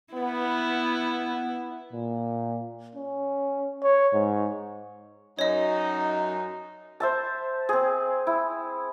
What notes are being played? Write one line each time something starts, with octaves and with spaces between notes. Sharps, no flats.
B3 E4
A#2
C#4
C#5
G#2
F#2 D#4 C#5 D#5
C5 E5 A5
C4 G#4
E4